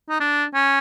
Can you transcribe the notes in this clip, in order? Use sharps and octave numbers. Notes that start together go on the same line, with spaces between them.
D#4
D4
C#4